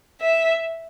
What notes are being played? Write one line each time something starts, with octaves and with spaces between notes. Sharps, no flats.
E5